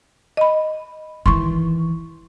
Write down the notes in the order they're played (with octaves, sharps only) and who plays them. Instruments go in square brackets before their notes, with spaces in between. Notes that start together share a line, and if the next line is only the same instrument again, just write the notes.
[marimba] D#5 B5
[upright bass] D#3 E3 [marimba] C6 C#6